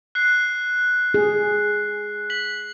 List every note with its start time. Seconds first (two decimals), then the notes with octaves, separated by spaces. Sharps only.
0.15 F#6 C7
1.14 G#4
2.30 B6 F#7